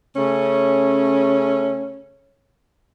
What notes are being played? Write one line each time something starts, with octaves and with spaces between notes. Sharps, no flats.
C#3 A3 C#4